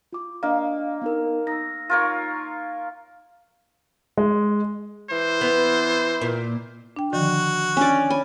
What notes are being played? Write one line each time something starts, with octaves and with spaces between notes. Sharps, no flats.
F4 D6
A#3 D4 D#5 F5
B3 D#4 A#4
D#4 E6 A#6
F4 A#4 C#5
G#3
E3 C5
B3
A#2
D4 G5
D3 D#3 F3 F#4
C#4 D4 D5
C#5 G#5 B5